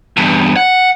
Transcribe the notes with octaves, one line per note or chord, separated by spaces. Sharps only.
E2 G2
F#5